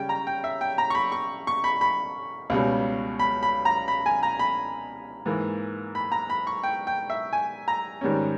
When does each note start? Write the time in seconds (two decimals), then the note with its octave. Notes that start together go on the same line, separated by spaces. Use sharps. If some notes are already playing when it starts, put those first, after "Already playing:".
Already playing: C#3 G3 C#4 G5
0.09 A#5
0.27 G5
0.44 E5
0.61 G5
0.78 A#5
0.90 C#6
0.95 B5
1.12 C#6
1.47 C#6
1.64 B5
1.81 B5
2.50 C#2 B2 G3 C#4
3.20 B5
3.43 B5
3.65 A#5
3.88 B5
4.06 G#5
4.23 A#5
4.39 B5
5.26 G#2 E3 A#3
5.95 B5
6.12 A#5
6.30 B5
6.47 C#6
6.63 G5
6.87 G5
7.10 E5
7.33 G#5
7.68 A#5
8.01 G#2 D#3 G3 C#4